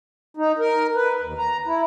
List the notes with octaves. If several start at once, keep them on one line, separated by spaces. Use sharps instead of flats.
D#4
A#4
B4
D#2
A#5
E4